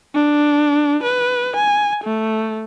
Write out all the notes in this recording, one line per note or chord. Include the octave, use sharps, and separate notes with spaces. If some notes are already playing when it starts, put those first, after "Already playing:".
D4
B4
G#5
A3